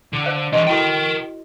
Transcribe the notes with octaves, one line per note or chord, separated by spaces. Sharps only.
D3
C5 F5
E3 D4 D#5 C6 C#6
E4 F#4 A4 A#4 G5